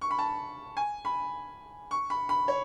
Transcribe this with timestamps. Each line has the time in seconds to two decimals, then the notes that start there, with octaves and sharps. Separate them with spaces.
0.01 C#6
0.11 B5
0.18 A5
0.77 G#5
1.05 B5
1.91 C#6
2.10 B5
2.29 B5
2.48 C#5